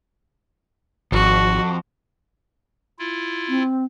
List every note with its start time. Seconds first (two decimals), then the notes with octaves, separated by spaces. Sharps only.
1.12 G#1 F2 F#4
2.99 E4 F4
3.49 C4